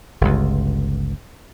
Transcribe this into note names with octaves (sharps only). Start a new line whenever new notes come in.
G1 C#2